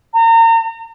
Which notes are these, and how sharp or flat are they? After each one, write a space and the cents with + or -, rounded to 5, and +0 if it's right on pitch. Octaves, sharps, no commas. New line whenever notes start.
A#5 -35